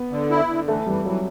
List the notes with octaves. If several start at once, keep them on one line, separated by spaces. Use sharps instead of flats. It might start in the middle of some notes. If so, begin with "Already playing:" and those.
Already playing: B3
D3
E4
D3
E3 A3
E3 G3
E3 F#3